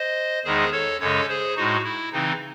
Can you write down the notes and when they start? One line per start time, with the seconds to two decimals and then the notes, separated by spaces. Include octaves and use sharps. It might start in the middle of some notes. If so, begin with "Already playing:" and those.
Already playing: C5 D#5
0.44 E2 D#3 G#3 D#4 G#4 C5
0.72 A4 C#5
1.00 F#2 C#3 G#3 C#4 A4 C#5
1.28 G#4 C5
1.56 A2 G#3 D#4 F#4
1.84 E4
2.12 C#3 E3 C4 D#4